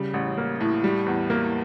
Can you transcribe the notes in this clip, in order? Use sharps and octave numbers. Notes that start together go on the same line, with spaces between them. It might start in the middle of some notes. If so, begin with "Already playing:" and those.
Already playing: C#3 G3
A1
A#3
A2
G3
E2
A#3